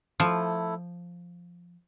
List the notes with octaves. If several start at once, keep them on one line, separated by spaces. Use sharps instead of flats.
F3 A3 E4 A4